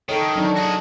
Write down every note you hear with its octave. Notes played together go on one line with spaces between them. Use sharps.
D#3 A4 C#5
F#3 D4 D#4
F#4 G#4